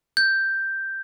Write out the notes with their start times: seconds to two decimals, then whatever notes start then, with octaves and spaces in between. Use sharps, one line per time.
0.17 G6